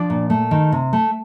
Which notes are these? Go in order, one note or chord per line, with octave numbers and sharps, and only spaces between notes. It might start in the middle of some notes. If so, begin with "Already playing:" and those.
Already playing: F3 D4 D5
A#2
A3
D#3
C3
A3